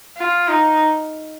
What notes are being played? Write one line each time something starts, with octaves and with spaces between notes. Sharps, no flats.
F4
D#4